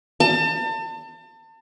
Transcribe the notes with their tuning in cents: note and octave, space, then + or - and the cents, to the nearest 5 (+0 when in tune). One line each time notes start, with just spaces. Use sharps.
A5 +35